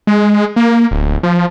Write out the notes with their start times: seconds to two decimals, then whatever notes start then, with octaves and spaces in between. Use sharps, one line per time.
0.07 G#3
0.56 A#3
0.91 D1
1.23 F3